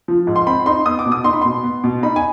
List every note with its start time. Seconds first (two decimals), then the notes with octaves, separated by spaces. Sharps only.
0.08 F3
0.27 G#2
0.36 C6
0.46 C4 B5
0.66 D#4 C6
0.86 B3 D#6
0.99 D6
1.06 B2
1.12 D#6
1.24 D#4 C6
1.33 B5
1.41 B2 C6
1.64 B3
1.84 B2
2.03 D#4 B5
2.16 G#5